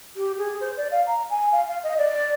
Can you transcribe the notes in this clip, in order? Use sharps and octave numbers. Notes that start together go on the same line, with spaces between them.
G4
G#4
C5
D5
F5
A#5
G#5
F5
F5
D#5
D5